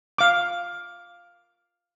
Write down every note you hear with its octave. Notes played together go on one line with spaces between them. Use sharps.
F5 D6